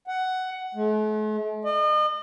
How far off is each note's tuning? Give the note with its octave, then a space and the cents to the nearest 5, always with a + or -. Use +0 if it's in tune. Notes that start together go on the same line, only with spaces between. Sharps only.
F#5 +10
A3 -45
D#5 -40